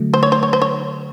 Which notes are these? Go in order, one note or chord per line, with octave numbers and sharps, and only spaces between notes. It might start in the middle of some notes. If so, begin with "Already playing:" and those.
Already playing: D3 F#3 A3
C5
C#5
C5
C#5
C5
C#5